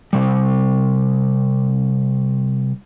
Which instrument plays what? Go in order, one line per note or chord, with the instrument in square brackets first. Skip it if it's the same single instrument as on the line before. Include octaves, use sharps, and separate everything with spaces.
[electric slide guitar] C3 G3